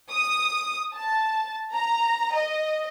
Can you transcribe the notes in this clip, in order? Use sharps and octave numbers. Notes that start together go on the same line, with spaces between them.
D#6
A5
A#5
D#5